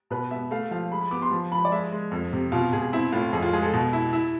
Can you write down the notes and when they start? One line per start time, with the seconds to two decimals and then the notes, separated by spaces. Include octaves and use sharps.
0.10 B2 B4
0.31 B3 E5
0.51 A3 F5
0.71 F3 F5
0.91 G#3 B5
1.01 B5
1.11 B3 D6
1.22 C6
1.31 F3
1.52 F3 B5
1.65 D5
1.71 G#3 E5
1.92 G#3
2.11 F2
2.33 C3
2.52 B2 F4
2.73 B2 G#4
2.93 C4 E4
3.12 A2 F4
3.33 F2 G#4
3.43 F4
3.53 G#3 G#4
3.63 A4
3.74 B2
3.93 E4
4.13 E4